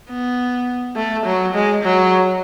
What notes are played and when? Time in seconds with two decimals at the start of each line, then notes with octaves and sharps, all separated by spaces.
0.10 B3
0.96 A3
1.25 F#3
1.54 G#3
1.83 F#3